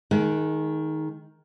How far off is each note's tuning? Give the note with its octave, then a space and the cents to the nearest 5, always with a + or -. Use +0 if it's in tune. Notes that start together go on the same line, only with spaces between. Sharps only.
D#3 +10 G#3 +30